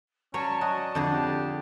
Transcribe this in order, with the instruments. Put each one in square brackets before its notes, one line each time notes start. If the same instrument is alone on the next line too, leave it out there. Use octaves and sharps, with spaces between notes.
[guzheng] F#3 C#5 [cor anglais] C#4 [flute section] D5 A5
[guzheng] F#4 [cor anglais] D#5
[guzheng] F2 D3 G#4 [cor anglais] D4
[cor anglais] G4